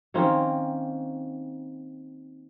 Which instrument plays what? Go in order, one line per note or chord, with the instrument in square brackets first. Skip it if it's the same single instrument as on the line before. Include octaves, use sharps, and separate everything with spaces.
[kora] D#3 A#3 C4 C#4